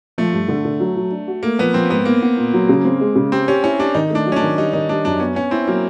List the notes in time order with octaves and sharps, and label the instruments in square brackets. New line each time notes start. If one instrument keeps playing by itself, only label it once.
[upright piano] F3 [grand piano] A3
[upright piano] G2
D3
D3
F#3
F#3
D4
F#4
[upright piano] A3 [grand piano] A#3
[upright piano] F3 [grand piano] B3
[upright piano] F3 [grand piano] C4
[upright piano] G#2 [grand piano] B3
[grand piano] A#3 [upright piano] B3
[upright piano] B3
A#2
F#3
C#3
C4
G#3
C#3
[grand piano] C4 [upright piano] G4
[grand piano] C#4 [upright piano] G4
[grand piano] C#4 [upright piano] E4
[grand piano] D4 [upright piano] G4
[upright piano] D#3 [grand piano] D#4
[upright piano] A3 [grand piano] D4
[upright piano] F#3
[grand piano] C#4
D4
[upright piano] D#3
[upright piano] G3 [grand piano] D#4
[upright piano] D#3 [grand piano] D#4
[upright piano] G3 [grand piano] D4
[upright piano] F#2 [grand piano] D4
[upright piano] B3 [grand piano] C#4
[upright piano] B3 [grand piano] C#4
[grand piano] C4 [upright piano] E4
[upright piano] F#3 [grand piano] A#3